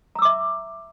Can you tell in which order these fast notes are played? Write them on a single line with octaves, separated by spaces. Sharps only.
A#5 E6 D6 E5